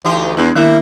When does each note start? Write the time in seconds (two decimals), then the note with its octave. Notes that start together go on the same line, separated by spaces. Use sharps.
0.05 D2 E3 D#4 G4
0.37 E2 G#3 B3 D4 E4
0.55 D#3 G3 A#3 E4 E5 F#6